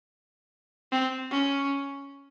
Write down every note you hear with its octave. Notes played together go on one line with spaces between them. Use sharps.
C4
C#4